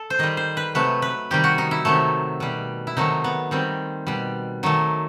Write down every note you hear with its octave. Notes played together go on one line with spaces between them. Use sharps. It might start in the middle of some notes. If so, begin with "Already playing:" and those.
Already playing: A4
C5
D#3 G3 D#5
C5
B4
C3 F#3 A3 B4
B4
C3 D#3 G3 G4
F#4
D#4
E4
C3 D#3 F#3 A3
B2 G3
E4
C3 D#3 F#3 A3 D#4
B3
D#3 G3 C4
B2 G3
D#3 F#3 A3